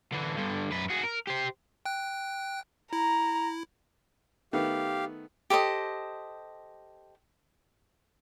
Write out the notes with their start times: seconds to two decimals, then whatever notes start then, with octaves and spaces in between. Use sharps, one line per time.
0.12 D3 E3
0.36 G2 D3
0.72 F#2 B4
0.90 F#4 G#4
1.04 A#4
1.27 G4 C5
1.85 G5 F#6
2.93 E4 A#5
4.53 D#3 A3 B3 G4 F5
5.50 G4 A4 C5 D#5